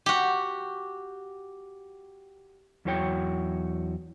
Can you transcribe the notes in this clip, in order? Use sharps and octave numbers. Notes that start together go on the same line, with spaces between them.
F#4 G4
E2 F#3 E4 F#4 C#5 G5